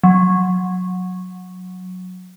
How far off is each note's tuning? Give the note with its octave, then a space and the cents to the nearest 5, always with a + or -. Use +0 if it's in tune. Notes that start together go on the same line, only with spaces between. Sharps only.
F#3 -15